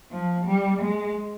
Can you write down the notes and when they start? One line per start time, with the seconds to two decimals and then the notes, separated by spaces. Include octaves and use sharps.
0.11 F3
0.46 G3
0.82 G#3